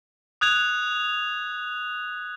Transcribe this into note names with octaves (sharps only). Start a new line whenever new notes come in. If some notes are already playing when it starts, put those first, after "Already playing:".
D#6 F#6 G#6 F7